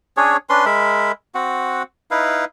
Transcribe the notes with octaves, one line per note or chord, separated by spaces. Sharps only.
C#4 D4 G#4 C#5
C#4 D4 B4 C6
G#3 A#4 E5 B5
C4 F#4 F#5
D#4 E4 B4 F5